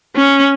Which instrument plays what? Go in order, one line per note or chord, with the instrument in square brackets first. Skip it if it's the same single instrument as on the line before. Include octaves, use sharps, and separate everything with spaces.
[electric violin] C#4